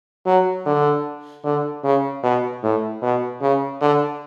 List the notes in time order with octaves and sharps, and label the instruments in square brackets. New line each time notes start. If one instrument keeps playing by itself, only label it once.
[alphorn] F#3
D3
D3
C#3
B2
A2
B2
C#3
D3